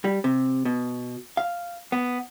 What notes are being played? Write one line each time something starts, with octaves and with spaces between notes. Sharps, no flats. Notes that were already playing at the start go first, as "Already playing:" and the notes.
G3
C3
B2
F5
B3